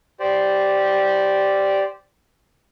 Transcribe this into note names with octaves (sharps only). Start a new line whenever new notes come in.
G4 C5 D5